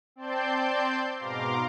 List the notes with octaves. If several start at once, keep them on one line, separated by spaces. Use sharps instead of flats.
C4 D5 G5 A5 C6 G6
G#2 B2 F5 A#5 C6 D6